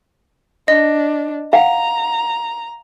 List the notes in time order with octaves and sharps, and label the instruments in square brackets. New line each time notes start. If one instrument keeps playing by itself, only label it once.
[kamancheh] D4 [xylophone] D#5
[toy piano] F5 F#5 [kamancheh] A#5